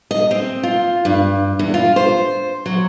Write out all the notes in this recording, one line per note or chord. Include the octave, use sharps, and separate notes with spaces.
D#5
C4
F4
G2
E2
F4
C5
F#3